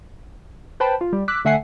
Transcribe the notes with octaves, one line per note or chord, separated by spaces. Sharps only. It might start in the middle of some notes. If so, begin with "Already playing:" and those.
B4 C5 G5 A5 B5
F4
G3
D6 E6 F#6 B6
D3 A3 E5 F#5 G#5 C7